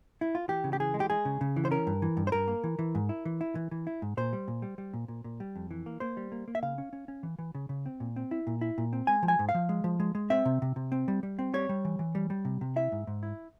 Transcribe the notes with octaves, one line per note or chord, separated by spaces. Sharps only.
E4
F4
E3 G4
C#3
G4
E3 G#4
G#3
G4
G#3 G#4
C#3
C#3
E3
C5
C#4 A#4
G2
E3
G2
C5
G2 A#4
A#3
E3
E3
G#2
E4
E3
E4
E3
E3
E4
G#2
A#2 C5
G3
A#2
G3
G3
A#2
A#2
A#2
G3
F2
E3
A#3
A#3 C5
G3
A#3
A#3
E5
C#3 F5
C#4
C#4
C#4
E3
E3
C#3
C#3
C4
A#2
C4
E4
A#2
E4
A#2
C4
G#3 G#5
F3
G#5
G#2
F5
F3
G#3
F3
G#3
G#3
C4 E5
C3
C3
C3
C4
G3
G3
C4
G3 C#5
G3
E3
E3
G3
G3
C3
C3
E4 E5
G#2
G#2
E4